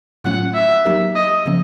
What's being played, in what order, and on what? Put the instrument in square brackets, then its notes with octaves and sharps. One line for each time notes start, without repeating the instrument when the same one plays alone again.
[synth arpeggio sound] A2 F#3 A3 C#4 F4 [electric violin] F#5
[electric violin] E5
[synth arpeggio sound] F#3 A#3 D#4 G4 A#4
[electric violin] D#5
[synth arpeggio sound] C#3 F3 A#3 C#4